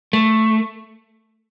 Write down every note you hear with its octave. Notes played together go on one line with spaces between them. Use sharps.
A3